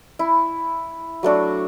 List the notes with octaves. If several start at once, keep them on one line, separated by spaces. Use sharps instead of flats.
E4
F#3 A3 D4 F#4